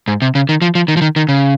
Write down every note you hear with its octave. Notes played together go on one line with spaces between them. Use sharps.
G#2
C3
C#3
D#3
F3
F3
D#3
F3
D#3
D#3
C#3